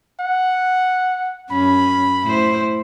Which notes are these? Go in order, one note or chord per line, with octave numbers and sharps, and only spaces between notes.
F#5
F#2 C#4 B5
A2 E4 C5